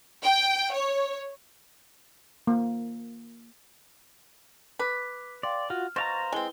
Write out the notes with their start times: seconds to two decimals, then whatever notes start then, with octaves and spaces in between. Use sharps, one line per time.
0.23 G5
0.73 C#5
2.47 A#3
4.79 B4 D6 B6
5.43 D5 F5 G5 C6
5.70 F4 F#4 F6
5.96 B2 C5 F5 A#5 C#6 A6 A#6
6.32 G#3 C4 E4 B4 G7